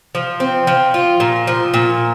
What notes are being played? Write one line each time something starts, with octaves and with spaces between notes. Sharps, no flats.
F3
C4
F3
F4
A#2
F3
A#2